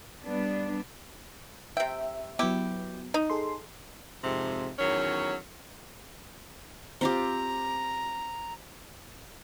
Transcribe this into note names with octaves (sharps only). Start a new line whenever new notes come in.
G3 B3 D4
C3 E5 G5
F#3 B3 E4 G4
D#4
G#4 A4 C6
F2 G#2 C3
E2 D#3 F#3 C#4
C4 F4 G4 A#5